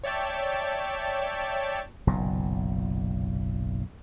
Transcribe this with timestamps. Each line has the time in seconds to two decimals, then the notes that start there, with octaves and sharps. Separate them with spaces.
0.04 C#5 D5 E5 G5 A5
2.07 F#1 B1 A#2